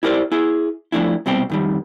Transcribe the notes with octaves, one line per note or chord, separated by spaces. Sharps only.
E4 G4 A#4 C5 D5
E4 G#4
F3 A3 D4 E4
C2 B2 G3 C4 G4
F2 D#3 G3